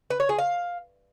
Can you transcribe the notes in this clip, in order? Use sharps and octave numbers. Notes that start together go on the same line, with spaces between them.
B4
C#5
G#4
F5